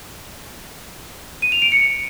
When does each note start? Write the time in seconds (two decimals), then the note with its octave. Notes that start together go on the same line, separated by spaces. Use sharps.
1.42 D#7
1.52 F7
1.62 D7
1.72 C#7